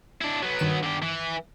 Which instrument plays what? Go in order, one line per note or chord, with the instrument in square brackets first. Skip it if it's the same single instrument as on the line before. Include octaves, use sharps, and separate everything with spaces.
[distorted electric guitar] D4 E4
F#3 B3
[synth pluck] G2 D#3 E7
[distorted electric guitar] D3 G4
E3